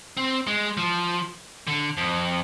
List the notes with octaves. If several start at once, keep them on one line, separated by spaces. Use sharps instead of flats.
C4
G#3
F3
D3
F2